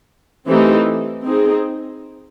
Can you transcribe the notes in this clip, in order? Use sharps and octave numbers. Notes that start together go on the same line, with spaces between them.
E3 A3 C4 D#4 G4
C4 D#4 G#4